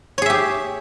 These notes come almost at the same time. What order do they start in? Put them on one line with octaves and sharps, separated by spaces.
C#5 G#4 E5 G4